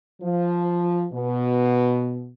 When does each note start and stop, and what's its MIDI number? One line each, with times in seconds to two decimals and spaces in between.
0.21 1.06 53
1.13 2.31 47